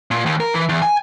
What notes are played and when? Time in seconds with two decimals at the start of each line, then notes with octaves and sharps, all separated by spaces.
0.11 A#2
0.26 D#2
0.40 A#4
0.54 E3
0.69 E2
0.82 G#5